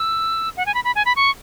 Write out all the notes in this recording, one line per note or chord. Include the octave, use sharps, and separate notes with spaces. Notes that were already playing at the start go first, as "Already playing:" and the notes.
Already playing: E6
F#5
G#5
B5
B5
G#5
B5
C#6